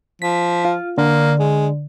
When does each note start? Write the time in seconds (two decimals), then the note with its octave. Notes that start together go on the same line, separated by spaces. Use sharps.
0.22 F3 B6
0.65 F4
0.98 D3 A#3
1.39 G#3